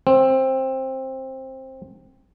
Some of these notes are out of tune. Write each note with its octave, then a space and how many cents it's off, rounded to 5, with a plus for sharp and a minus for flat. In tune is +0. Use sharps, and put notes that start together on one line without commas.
C4 +15